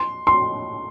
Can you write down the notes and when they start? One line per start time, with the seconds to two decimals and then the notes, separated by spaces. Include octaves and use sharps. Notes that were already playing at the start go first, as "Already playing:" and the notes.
Already playing: C6
0.27 C6